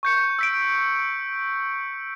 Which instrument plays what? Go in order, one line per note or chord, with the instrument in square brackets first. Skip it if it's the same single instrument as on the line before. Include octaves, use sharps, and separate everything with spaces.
[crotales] C#6 G6 C#7
E6 B6 D7